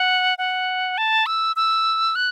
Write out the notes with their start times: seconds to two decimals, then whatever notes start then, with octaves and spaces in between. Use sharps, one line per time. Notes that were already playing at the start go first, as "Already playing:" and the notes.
Already playing: F#5
0.38 F#5
0.98 A5
1.26 E6
1.56 E6
2.15 F#6